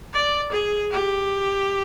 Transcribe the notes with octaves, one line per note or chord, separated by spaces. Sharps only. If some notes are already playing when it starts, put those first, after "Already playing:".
D5
G#4
G4